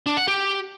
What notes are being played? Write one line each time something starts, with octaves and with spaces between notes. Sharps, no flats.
D4
F#5
G4